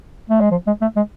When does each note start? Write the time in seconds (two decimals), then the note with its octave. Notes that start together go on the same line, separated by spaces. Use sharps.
0.29 A3
0.40 G#3
0.51 F3
0.67 G#3
0.81 A3
0.96 G#3